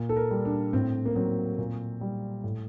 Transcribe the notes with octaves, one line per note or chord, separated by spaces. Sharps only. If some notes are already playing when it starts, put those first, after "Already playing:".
Already playing: A#2
A4
A#4
G3
D4
A2 C4
A#3
F#3 C4
A#2
G3
A2